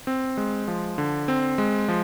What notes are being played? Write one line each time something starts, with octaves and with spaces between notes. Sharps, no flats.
C4
G#3
F3
D3
C4
G#3
F3